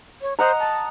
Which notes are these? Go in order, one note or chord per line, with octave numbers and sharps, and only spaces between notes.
C#5
C5 D#5 F#5 A#5
A5